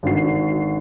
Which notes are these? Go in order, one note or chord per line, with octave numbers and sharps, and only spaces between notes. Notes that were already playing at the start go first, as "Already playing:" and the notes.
G#1 D3 F#4 C7